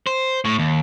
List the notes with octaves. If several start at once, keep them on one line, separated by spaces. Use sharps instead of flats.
C5
A2
D#2